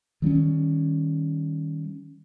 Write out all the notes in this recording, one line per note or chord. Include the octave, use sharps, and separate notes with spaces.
D#3 G3 C4 C#4